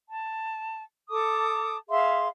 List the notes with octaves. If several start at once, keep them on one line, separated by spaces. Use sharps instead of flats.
A5
A4 A5 D6 D#6
G#4 E5 F5 C6